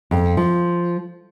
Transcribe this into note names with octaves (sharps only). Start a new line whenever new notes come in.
F2
F3